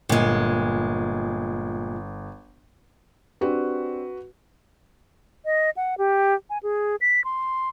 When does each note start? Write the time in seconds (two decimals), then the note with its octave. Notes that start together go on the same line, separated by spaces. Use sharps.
0.09 G1 A#2 G#3
3.41 C4 D4 F#4 G4 B4
5.45 D#5
5.77 F#5
5.98 G4
6.50 G#5
6.63 G#4
7.01 B6
7.24 C6